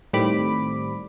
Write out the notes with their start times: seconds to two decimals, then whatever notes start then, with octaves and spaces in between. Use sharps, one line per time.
0.13 A2 D#3 G3 C4 B5 D6